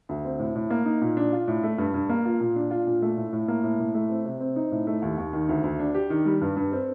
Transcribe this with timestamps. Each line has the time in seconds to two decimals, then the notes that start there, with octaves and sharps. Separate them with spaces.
0.09 D2
0.25 C4
0.39 A2
0.55 A2
0.70 A#3
0.86 D#4
1.01 A#2
1.17 D4
1.33 F4
1.48 A2
1.63 A3
1.78 G2
1.94 G2
2.09 A#3
2.25 F4
2.40 A#2
2.56 D4
2.71 F4
2.86 A#2
3.02 A3
3.17 A2
3.33 A2
3.48 A#3
3.63 A2
3.79 A2
3.94 A3
4.10 C4
4.25 C3
4.40 C4
4.56 D#4
4.71 A2
4.87 A3
5.02 D#2
5.18 D#2
5.33 D#3
5.49 D2
5.63 D2
5.79 D4
5.94 G4
6.10 D#3
6.26 G3
6.41 G2
6.56 G2
6.72 C4